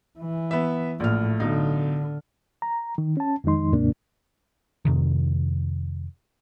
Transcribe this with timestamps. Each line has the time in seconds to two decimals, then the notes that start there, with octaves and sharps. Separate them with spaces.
0.19 E3
0.51 B3 E5
1.00 A#1 A2 F6
1.40 B1 D3 D#4
2.62 A#5
2.98 D#3
3.17 C#4 A5
3.44 F2 D#3 G#3 D#4 C6
3.73 D#2 G#2 C3 A#3 D4
4.85 F2 C3 D#3